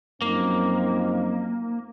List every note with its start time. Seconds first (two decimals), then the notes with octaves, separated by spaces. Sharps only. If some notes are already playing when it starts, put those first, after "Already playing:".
0.21 F#2 F3 A#3 C4 D#4